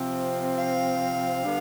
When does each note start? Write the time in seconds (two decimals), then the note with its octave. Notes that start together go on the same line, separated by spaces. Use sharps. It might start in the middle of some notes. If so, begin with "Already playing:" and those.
Already playing: C3 F3 C4
0.57 F5
1.44 D3 G3 B3 D4